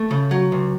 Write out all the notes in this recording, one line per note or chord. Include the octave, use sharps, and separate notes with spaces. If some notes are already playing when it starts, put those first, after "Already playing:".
Already playing: A3
C#3
F#3
C#2